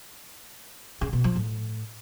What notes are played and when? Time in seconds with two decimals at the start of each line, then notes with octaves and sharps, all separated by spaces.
1.01 C#3
1.13 B2
1.24 F3
1.36 A2